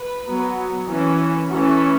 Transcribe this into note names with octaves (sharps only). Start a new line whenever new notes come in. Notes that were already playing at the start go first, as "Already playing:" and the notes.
Already playing: B4
F#3 B3
E3 C#4
E3 A3 C#4 F#4